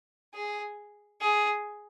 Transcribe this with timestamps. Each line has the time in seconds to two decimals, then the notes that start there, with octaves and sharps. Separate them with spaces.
0.34 G#4
1.21 G#4